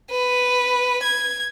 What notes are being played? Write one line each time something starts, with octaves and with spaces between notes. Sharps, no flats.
B4
G#6